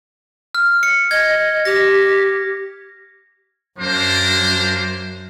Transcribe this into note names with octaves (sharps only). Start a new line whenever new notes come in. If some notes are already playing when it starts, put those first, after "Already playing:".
F6
C#7
D#5 G#6
G4 A#6
F#2 A#3 D4 C5